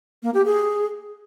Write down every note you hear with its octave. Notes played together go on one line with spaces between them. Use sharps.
A#3
G4
G#4